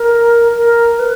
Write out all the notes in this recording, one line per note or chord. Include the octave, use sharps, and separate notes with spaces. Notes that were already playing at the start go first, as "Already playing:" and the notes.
Already playing: A#4
A#4
B4